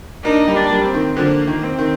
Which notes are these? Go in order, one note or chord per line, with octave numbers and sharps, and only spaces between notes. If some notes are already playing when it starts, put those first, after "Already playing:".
A#3 D4 D#4
G3 A#3
D4
G3 A#3
C4
D#3
D3 F3 A#3
D#3
C4
D#3